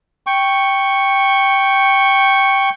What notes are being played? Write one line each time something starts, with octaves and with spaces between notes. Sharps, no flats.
G5 C#6